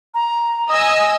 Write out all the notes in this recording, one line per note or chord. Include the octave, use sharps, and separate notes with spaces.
A#5
D#5 G#5 D#6 E6